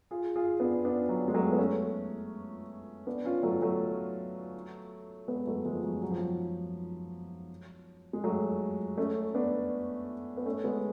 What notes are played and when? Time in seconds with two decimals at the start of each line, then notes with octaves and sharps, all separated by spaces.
0.11 F4 G#4
0.36 F4 G#4
0.60 B3 D4
0.85 B3 D4
1.09 F#3
1.28 G#3
1.34 F#3 A3
1.52 B3
1.58 A3 C#4
3.07 B3 D4
3.25 C#4 F4
3.43 F#3 A3
3.62 F#3 A3
5.28 G#3 B3
5.47 F#3 A3
5.65 F3 G#3
5.83 F#3
6.02 F#3
6.11 F3
6.18 F#3
8.13 G#3
8.24 F#3 A3
8.97 A3 C#4
9.35 B3 D4
10.37 B3
10.45 A3 C#4
10.64 G#3 B3